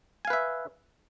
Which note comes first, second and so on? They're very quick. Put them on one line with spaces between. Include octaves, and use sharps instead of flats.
G#5 F5 B4 E5